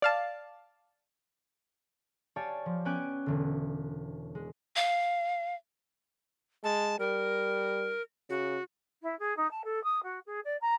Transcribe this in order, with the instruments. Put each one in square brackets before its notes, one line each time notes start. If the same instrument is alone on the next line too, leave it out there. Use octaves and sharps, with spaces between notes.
[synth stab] D5 F5 A5
[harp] G4 C#5 D5 F5 G#5 A5
F3
B3 C#4 G5 G#5 D6 F#6
E1 D3
G#3
[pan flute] F5
[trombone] G#3 [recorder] A5
[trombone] G3 [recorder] A#4
[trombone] C#3 [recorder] F#4
[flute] E4
G#4
D#4
A5
A4
D#6
F#4
G#4
D5
A#5